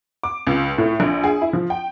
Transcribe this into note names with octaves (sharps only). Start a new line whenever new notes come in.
D6
C#2
A2
A#1
G#4
E4
F3
G5